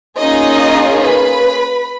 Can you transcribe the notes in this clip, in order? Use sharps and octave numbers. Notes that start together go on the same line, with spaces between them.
A#3 C#4 D#4 F4 G#4 D#5
B4 B5